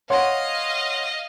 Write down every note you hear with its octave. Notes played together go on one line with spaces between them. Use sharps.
C#5 D#5 F5 F#5 C6